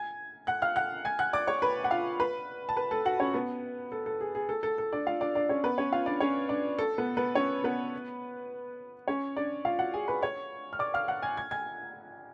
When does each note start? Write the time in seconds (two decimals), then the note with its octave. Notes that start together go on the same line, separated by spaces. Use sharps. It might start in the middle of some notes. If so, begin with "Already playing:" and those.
Already playing: G#5 G#6
0.47 F#5 F#6
0.62 F5 F6
0.76 F#5 F#6
1.05 G#5 G#6
1.19 F#5 F#6
1.33 D5 D6
1.47 C#5 C#6
1.62 B4 B5
1.84 F#5
1.91 F4 F5
2.20 B4 B5
2.69 A5
2.77 B4 B5
2.91 A4 A5
3.05 F#4 F#5
3.20 C#4 C#5
3.34 B3 B4
3.92 A4
4.06 A4
4.21 G#4
4.35 G#4
4.49 A4
4.63 A4
4.78 A4
4.92 D4 D5
5.06 F4 F5
5.21 D4 D5
5.35 D4 D5
5.49 C#4 C#5
5.64 B3 B4
5.78 C#4 C#5
5.92 F4 F5
6.06 D4 D5
6.20 C#4 C#5
6.49 D4 D5
6.79 A4
6.98 B3 B4
7.17 B3 B4
7.35 C#4 C#5
7.64 B3 B4
9.08 C#4 C#5
9.37 D4 D5
9.65 F4 F5
9.79 F#4 F#5
9.94 G#4 G#5
10.08 B4 B5
10.22 C#5 C#6
10.73 F6
10.79 D5 D6
10.94 F5 F6
11.08 F#5 F#6
11.22 G#5 G#6
11.37 G#6
11.51 G#5 G#6